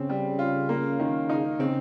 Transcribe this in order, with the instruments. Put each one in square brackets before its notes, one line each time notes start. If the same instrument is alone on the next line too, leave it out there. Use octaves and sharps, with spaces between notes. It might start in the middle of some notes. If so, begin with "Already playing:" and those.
Already playing: [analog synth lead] C#3 [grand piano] C4
[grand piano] G3
F4
A#3
D#3
D#4
[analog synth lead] C#3 [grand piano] C4